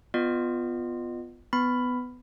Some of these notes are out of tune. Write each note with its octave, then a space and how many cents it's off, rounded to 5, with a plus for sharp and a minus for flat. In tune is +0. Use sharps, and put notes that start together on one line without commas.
B3 +15 F4 +0 D#5 -35
B3 +15 B5 +10